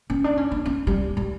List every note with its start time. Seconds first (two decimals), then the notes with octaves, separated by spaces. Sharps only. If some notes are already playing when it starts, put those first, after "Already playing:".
0.10 C#4
0.24 D4
0.37 C#4
0.51 D4
0.66 C#4
0.87 G3
1.17 G3